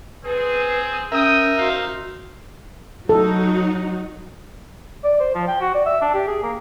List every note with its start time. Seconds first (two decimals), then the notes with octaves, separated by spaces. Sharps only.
0.24 C4 G#4 B4
1.12 C#4 A#4 E5 G5 D#6
1.58 D#4 F#4 C5 F5
3.09 F#3 D#4 F#4 A4
5.04 D5
5.20 C5
5.35 F3
5.48 G5
5.60 F#4
5.74 D5
5.86 E5
6.01 D4
6.14 G4
6.28 G#4
6.43 A#3